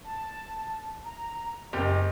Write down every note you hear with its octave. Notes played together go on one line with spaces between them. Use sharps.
A5
A#5
F#1 G4 D#5